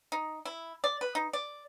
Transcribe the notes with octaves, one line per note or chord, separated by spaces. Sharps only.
D#4
E4
D5
B4
D#4
D5